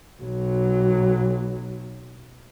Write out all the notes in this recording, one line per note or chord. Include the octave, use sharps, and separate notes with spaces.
B1 F#3